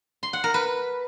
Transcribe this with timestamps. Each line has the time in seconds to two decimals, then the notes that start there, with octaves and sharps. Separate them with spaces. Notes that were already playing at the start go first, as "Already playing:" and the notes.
0.23 C6
0.33 F#5
0.44 A#4
0.54 B4